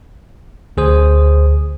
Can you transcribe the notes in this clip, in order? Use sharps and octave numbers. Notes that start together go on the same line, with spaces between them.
D2 G#4 C5 D#6